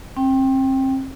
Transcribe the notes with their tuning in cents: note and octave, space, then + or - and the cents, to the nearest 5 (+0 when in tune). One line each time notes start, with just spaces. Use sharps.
C4 +35 G5 +0